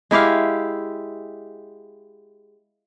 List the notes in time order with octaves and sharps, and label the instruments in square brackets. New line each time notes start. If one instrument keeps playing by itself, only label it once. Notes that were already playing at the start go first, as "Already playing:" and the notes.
[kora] G#3 E4 G4 F5